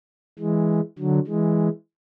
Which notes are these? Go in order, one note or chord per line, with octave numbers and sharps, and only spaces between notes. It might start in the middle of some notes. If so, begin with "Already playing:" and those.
E3 G#3
D3 F#3
E3 G#3